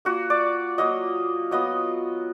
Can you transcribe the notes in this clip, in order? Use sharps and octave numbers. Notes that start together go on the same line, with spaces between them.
A#3 F4 F#4
D5
F#3 A#3 F4 D#5
F#3 B3 F4 D#5